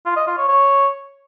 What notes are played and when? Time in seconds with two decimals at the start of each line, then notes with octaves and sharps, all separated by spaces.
0.06 F4
0.16 D#5
0.27 F4
0.38 C#5
0.48 C#5